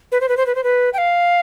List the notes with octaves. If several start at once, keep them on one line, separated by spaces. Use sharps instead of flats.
B4
C5
B4
C5
B4
C5
B4
G5
F5